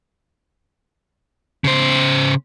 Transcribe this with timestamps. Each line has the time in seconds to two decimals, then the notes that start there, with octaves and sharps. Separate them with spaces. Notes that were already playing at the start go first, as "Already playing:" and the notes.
1.64 C#3 C5